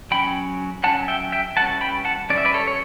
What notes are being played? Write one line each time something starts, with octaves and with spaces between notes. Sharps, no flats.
F#3 C#4 G5 B5
F#3 C#4 F#5 A5
E5 G5
E5 G5
E3 G3 C#4 F#5 A5
G5 B5
F#5 A5
E3 G3 C#4 D5
E5
B4 D5
A4 C#5
C#5